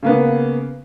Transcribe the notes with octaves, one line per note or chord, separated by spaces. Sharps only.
C#3 A#3 B3